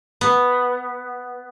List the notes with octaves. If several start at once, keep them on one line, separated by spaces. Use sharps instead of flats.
B3